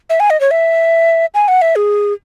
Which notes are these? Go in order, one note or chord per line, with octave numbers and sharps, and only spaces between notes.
E5
G#5
D#5
C#5
E5
G#5
F#5
E5
G#4